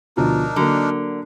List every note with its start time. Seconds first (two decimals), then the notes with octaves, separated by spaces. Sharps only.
0.17 D2 B2 F3 D4 D#4 A#4
0.56 D3 F#3 A#3